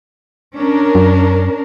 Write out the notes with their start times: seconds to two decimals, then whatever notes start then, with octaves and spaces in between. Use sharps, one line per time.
0.57 C#4 D4 A#4
0.95 F#2